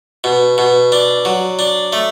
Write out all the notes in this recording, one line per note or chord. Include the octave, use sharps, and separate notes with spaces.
B2
B2
D4
F#3
D4
A3